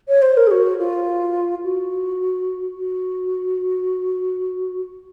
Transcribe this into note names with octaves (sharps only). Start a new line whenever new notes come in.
C#5
C5
A#4
G#4
F#4
F4
F#4
F#4